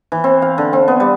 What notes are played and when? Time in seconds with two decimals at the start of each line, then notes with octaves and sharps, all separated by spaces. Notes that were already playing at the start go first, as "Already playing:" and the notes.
0.12 E3
0.24 C4
0.42 F5
0.58 D3
0.73 C4
0.88 B3
1.00 G3